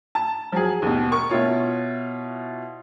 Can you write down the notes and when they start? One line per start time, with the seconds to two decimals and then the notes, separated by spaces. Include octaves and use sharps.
0.15 A5
0.52 F3 F#3 G#4
0.82 D#2 B2
1.12 A#4 C#6
1.30 B2 E4 F4 C#5